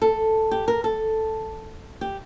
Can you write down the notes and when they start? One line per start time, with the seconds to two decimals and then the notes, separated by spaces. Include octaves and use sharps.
0.02 A4
0.51 G4
0.68 A#4
0.84 A4
2.01 G4